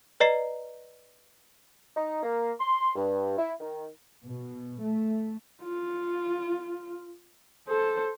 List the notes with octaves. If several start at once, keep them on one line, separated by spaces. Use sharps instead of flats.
B4 D5 D#5 A#5 C7
D#4
A#3
C6
G2
E4
D#3
B2
A3
F4
A4 C5